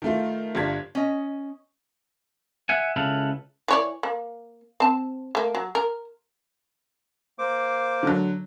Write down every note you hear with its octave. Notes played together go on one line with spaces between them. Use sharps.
D#3 A3 F4
G1 G2 F4 G#6 B6
C#4 D#5
E5 F#5 G#5
C#2 C#3 E4 A4 B4 F5
E3 C#5 D5
A#3
C4 A5
A3 A#3
F#3
A#4
A#3 C5 D6
D3 F#3